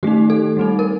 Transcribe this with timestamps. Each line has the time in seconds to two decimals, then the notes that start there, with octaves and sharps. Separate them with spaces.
0.03 D#3 A3 D#4 G4
0.30 A4
0.57 G3 C4 D#4
0.79 A#4